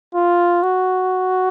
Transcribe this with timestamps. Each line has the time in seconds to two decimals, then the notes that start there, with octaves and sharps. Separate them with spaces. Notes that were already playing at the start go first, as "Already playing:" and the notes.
0.15 F4
0.63 F#4